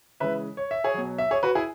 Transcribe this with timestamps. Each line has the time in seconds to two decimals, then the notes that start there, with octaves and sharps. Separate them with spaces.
0.20 C#3 E3 G#3 B4 E5
0.57 C#5
0.71 E5
0.84 G#4 C#5
0.94 B2 F#3
1.18 E5
1.31 G#4 C#5
1.43 F#4 B4
1.55 E4 G#4